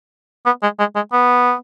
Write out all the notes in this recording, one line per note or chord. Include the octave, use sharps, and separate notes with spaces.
B3
G#3
G#3
G#3
B3